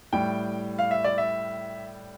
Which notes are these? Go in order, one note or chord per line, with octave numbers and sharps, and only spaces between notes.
A2 G3 G5
F5
E5
D5
E5